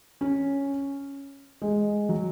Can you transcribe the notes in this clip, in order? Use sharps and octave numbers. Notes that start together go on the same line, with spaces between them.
C#4
G#3
F#3